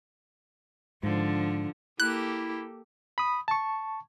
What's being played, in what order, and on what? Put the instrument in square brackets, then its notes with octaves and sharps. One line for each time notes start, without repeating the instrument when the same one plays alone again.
[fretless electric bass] G#2 [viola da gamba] D3 F3
[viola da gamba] A#3 G4 A4 [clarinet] E4 [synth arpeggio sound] F#6
[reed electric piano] B5 D#6
A5 C#6